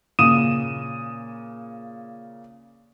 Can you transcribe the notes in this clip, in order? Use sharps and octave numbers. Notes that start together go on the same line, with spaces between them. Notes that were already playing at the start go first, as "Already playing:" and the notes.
A#2 C#3 D#6 D#7 E7